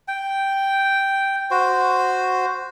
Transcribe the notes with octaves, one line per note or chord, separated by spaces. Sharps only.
G5
F#4 C5